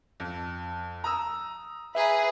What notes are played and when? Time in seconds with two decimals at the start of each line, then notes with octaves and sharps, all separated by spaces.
0.20 F2
1.04 A#5 D#6 E6
1.95 G#4 B4 E5 A#5